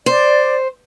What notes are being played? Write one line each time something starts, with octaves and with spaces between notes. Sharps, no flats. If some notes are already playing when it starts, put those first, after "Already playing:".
C5 D5